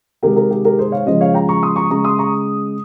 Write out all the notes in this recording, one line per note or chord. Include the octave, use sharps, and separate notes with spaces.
C3 D#3 G#3 G4 A#4
G4 A#4
G4
G4 A#4
G#4 C5
C#5 F5
C#3 F3 G#3 C5 D#5
C#5 F5
G5 A#5
A#5 C#6
C6 D#6
A#5 C#6
C#3 G#3 A#5 C#6
C6 D#6
A#5 C#6